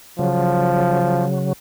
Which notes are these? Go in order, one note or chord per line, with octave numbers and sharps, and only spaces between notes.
C#3 F3 F#3